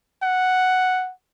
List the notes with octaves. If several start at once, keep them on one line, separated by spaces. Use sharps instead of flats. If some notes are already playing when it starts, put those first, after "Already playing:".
F#5